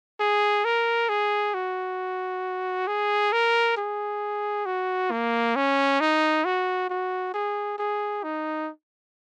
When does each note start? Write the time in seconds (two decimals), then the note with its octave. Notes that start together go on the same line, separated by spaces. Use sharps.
0.20 G#4
0.65 A#4
1.09 G#4
1.54 F#4
2.87 G#4
3.32 A#4
3.77 G#4
4.66 F#4
5.11 A#3
5.56 C#4
6.00 D#4
6.45 F#4
6.90 F#4
7.34 G#4
7.78 G#4
8.23 D#4